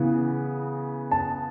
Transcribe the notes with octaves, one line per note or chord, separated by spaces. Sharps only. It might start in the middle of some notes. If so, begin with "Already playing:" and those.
Already playing: C#3 E3 B3
A5